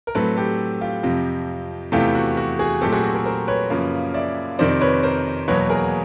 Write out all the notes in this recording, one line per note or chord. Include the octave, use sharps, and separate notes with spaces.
A#4
A2 F#3 A3 C4 A4 B4
G4 A4
F4 G4
F2 C3 F3
E2 C3 E3 A3 F4 G4
F#4
F#4
F#4 G#4
A#2 F#3 A3 C4 G4 A4
F#4 G#4
F#4
G#4 A#4
A#4 C5
B4 C#5
F#2 C#3 F3 A#3
D5 E5
F2 C3 D#3 C5 D5
B4 C#5
A#4 C5
E2 B2 F#3 A#3 B4 C#5
G#4 A#4